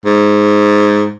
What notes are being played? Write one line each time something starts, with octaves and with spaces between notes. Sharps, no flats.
G#2